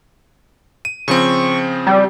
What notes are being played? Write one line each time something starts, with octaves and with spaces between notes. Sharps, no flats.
D#7
C#3 F3 C4 C#6
G3